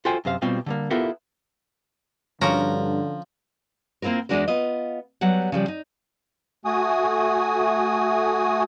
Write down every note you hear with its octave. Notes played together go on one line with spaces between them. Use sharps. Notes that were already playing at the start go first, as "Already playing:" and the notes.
F4 F#4 A4 C5 G5 G#5
F#2 C3 C5 F5
B2 G3 C4 F4 G4
D3 G3 A#3
B3 E4 F4 G4 A4 A#4
G2 D3 F3 C#4 F#4 A#4 A#5
A#3 C4 E4 F4 A#4
E2 B2 G#3 D4 F#4 A#4
B3 F4 D#5
F#3 G3 B3 F#5
C#3 F3 G3
D#4
A3 F#4 G#5 D#6